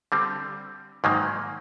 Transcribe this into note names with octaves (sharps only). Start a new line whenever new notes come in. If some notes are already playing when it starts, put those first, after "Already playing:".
D3 G3 C4
G#2 D#3 F#3 A#3